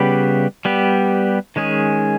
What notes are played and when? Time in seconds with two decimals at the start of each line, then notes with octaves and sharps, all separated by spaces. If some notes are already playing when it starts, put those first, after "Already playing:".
Already playing: C#3 G3 B3 G4 B4
0.65 G3 B3 G4
1.56 D#3 G#3 C#4 G#4